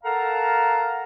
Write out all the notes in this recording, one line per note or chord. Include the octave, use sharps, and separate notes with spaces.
A4 A#4 F5 F#5 A5 A#5